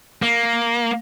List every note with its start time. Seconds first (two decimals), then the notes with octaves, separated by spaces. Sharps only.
0.22 A#3